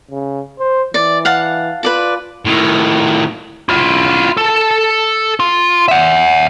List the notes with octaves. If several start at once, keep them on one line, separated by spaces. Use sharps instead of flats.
C#3
C5
E3 D5
F5 F#5 A5
F4 B4 D5 A5
A2 D#3
E4 F4
A4 A5
F4
E5 F#5